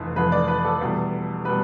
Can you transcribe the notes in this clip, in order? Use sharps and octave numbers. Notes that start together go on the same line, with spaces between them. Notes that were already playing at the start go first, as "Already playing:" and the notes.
Already playing: F1 F2 E3
F1 F2 E3 B4
D5
B4
A4
E2 B2 G3
B2 G3 B4